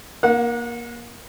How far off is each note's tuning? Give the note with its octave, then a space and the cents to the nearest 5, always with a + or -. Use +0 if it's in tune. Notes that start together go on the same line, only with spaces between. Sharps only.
A#3 +20 F#5 -30